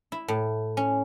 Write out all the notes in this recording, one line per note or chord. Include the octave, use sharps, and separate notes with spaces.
E4
A2
C#4